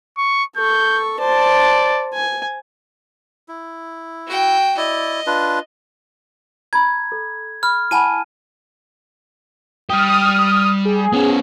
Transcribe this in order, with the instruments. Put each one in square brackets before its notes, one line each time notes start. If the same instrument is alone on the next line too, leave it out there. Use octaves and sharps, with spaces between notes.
[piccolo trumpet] C#6
[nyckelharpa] A4 C#6 [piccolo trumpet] G6
[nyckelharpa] C5 A5 [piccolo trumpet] D5
[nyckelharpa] G#5
[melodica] E4
[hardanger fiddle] F#4 G5
[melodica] E4 D5 [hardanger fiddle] D#5
[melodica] D4 F4 B4
[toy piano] A#5 B5 [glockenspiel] G#6
[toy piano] A4
[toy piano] B5 [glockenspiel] F6
[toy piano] E4 F#5 B5 [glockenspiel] G#5 A5 D#7
[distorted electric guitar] G3 G4 [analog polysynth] D#6 F6
[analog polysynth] G#4
[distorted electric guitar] B3 C#4